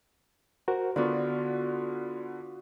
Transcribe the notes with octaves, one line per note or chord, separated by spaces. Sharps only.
F#4 A#4 C5
D3 B3 F4 F#4 D5